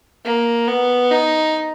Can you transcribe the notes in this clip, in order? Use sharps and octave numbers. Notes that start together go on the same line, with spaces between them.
A#3
B3
D#4